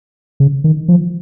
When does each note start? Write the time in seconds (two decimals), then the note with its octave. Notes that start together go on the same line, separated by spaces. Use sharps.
0.40 C#3
0.64 D#3
0.88 F3